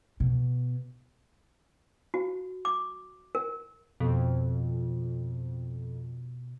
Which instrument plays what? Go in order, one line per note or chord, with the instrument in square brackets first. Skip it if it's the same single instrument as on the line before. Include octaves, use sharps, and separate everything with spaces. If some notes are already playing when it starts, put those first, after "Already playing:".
[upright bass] B2
[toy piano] F#4
D6
A#4
[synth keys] F2 [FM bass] B2